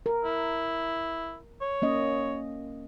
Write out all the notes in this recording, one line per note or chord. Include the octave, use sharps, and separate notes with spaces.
A#4
E4
C#5
A#3 C#4 D#5